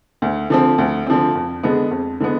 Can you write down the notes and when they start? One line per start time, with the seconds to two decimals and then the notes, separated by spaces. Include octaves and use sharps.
0.22 D2
0.50 D3 F3 C4
0.78 D2
1.07 D3 F3 C4
1.35 F2
1.63 D3 G#3 B3
1.91 F2
2.20 D3 G#3 B3